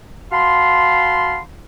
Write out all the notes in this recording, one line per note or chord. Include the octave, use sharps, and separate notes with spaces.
F#4 F5 A5 B5 C6